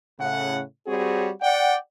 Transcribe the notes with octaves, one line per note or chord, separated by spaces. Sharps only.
A2 C#3 F#5
G3 C4 F#4 G#4 C#5
D5 F#5 G5